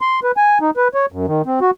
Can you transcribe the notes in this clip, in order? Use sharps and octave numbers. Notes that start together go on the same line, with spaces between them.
C6
B4
G#5
D#4
B4
C#5
F#2
D#3
C4
F#4